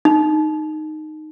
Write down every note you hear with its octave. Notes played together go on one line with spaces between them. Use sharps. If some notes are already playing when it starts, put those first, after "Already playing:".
D#4